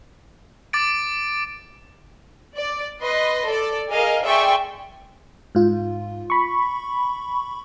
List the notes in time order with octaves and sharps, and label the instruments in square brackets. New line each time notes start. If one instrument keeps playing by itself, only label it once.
[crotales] D6 A6 D7
[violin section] D5
B4 D#5 C6
A4 D5
G#4 A#4 D#5 F5
G#4 D5 E5 G5 C6 C#6
[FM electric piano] G#2 F4
B5 C#6